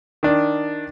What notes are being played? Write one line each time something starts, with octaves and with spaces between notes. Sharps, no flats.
D#3 D4